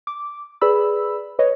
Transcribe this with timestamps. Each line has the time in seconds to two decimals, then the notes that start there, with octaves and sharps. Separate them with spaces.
0.07 D6
0.61 G#4 B4 D5 B5 E6
1.39 B4 C#5 D#5